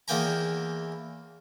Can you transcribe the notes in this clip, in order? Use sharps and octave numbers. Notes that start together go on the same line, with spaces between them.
E2 E3 A#3 G5 G#5 A#5